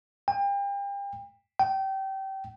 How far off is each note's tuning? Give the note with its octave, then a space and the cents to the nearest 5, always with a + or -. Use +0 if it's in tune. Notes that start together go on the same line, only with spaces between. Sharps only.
G5 +35
G5 -25